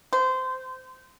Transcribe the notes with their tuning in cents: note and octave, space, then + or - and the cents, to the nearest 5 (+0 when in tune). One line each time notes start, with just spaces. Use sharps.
C5 -20